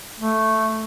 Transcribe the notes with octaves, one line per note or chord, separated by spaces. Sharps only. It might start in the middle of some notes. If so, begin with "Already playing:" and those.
A3